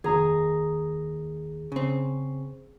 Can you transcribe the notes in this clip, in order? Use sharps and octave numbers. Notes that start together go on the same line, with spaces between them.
F1 D#2 G#4 A#5 D#6
C#3 C4